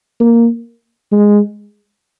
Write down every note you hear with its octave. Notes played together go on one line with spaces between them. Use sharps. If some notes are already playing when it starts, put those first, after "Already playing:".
A#3
G#3